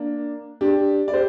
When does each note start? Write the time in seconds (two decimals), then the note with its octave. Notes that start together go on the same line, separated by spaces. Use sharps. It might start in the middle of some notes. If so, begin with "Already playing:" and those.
Already playing: A#3 D4
0.61 D4 G4
1.08 D5
1.13 G4 C5